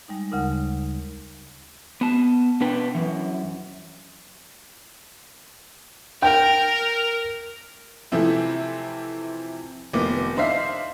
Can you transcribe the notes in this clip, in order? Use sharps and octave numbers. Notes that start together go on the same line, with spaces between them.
G3 G#3 D#4
D2 C#3 D#4 A#4
B3 A5
B2 D4 B4 G5
F#2 E3
A#4 G5
C3 E3 F3 A3 C4 E4
F1 D#3 A#3 B3 D6
D4 D#4 C5 E5 F5 C7